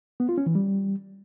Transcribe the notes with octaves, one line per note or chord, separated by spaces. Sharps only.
B3
F4
C#4
E3
G3